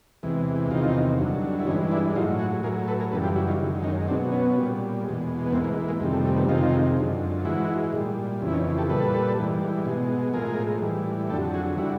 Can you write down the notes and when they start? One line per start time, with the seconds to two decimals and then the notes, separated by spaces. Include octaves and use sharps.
0.23 E2 C3 E3 G#3
0.71 E2 C3 D#3 D#4 F4
1.19 G2 D3 F#3
1.59 E4
1.67 G2 E3 G#3 C#4 D#4
1.92 D4 E4
2.15 A2 F#3 D#4 F4
2.39 F#4 G#4
2.63 A2 F#3 G#4 A#4
2.88 A4 B4
2.99 G#4 A#4
3.11 F#2 C#3 E3 G3 A4 B4
3.24 F4 G4
3.35 E4 F#4
3.47 D#4 F4
3.60 F#2 D#3 G#3
3.84 C#4 D#4
4.08 B2 F#3 C4 D4
4.32 B3 C#4
4.56 A#2 G3
5.04 E2 B2 G#3
5.47 B3
5.52 G#2 E3 G#3 A#3 C4
5.64 G#3 A#3
5.88 G#3 A#3
6.00 F2 C3 D#3 G3 G#3
6.13 A3
6.25 A3
6.36 A3 B3
6.49 F2 C3 D#3 G#3 D#4 F4
6.97 F#2 D3 F3
7.45 G#2 E3 G#3 E4 F#4
7.93 A#2 G3
8.42 F2 C#3 E3
8.47 E4
8.53 C#4 D#4
8.78 G4 A4
8.89 A#2 G3 A4 B4
9.37 G#2 E3 G3
9.86 B2 G#3
10.33 A2 F3 G#3 G#4 A#4
10.82 A2 E3 G3
11.30 F2 D3 F#3 G4 A4
11.54 F#4 G#4
11.78 D3 G3 E4 F#4